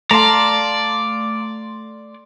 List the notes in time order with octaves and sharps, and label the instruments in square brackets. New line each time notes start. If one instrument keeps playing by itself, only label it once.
[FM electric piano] A3 C6 [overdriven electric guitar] D5 [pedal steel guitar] F5 A5 A#5